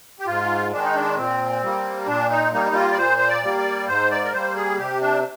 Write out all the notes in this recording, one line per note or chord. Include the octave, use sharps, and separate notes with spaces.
G4
G#2 F4
D#3 G#3 D4
D#4
D4
A#2 C4
G3 A#3
A#2 D4
D#4
G3 A#3 D#4
D#4
F4
D5
A#2 C5
C5
D5
G3 A#3
D5
G#2 C5
D5
A#4
G3 A#3 C5
G#4
C3 G4
D4